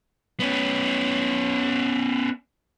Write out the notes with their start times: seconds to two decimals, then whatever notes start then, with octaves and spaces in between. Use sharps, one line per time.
0.40 B3 C#4